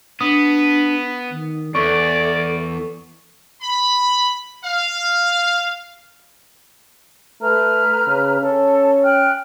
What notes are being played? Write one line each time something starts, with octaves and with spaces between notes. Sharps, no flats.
B3 D4 D#6
D#3
E2 A4 D5 C#6
B5
F5
A3 B4 A#5 F6
C#3
C#4 A4
G5 F6 F#6